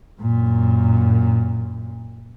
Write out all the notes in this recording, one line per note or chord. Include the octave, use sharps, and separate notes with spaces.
F#2 A#2